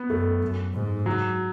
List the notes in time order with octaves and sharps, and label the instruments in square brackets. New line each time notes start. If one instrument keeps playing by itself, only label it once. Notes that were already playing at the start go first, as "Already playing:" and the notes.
Already playing: [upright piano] B3
[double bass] F#2 [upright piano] A3
[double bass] F#2
G#2
[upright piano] F#3